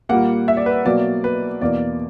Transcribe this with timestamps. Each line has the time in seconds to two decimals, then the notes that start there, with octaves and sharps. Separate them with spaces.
0.09 A#2 G3 A#3 F#5
0.48 E5
0.57 D5
0.66 B4
0.85 B2 F#3 A#3 D5
1.24 B4
1.61 E2 B2 A#3 D5